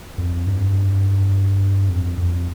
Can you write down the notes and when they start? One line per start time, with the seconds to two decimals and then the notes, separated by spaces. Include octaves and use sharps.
0.18 F2
0.46 G2
1.89 F2
2.17 F2